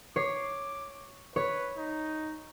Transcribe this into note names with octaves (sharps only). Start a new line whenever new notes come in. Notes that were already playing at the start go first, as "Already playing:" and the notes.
C#5 D6 C7
B4 C#5
D#4